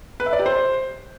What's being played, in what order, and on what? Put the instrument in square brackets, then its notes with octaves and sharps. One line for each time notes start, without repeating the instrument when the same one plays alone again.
[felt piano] B4
E5
D5
G4
C5